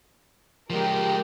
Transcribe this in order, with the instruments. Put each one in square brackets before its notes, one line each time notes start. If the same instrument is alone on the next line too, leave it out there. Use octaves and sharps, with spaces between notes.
[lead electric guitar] F3 G#3 [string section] G4 A#4